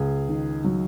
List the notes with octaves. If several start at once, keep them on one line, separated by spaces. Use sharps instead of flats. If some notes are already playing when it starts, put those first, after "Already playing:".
Already playing: C#2 G#4
D#3
F#3